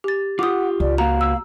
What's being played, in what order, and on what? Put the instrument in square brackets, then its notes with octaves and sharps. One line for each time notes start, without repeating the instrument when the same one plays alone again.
[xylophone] G4 A6
[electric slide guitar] F4 G4 [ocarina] F#5 [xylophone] D6 D#6
[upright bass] C#2 [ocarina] D5
[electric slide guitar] A#3 F#4 [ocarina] F5 [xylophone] A#5
[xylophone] E6